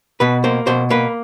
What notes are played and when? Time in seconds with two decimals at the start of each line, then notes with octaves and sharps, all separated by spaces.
0.20 B2 B4
0.44 A#3 C5
0.67 B2 C5
0.90 A#3 B4